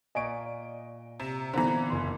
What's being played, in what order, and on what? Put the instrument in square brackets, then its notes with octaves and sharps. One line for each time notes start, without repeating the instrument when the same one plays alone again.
[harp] A#2 D5 G#5 [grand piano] D#5 C#6 D7
[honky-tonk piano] C3 [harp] A#5 [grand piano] E7
[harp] A#2 B3 [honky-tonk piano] D3 E3 [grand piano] C4 A#5
[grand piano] F#1 C6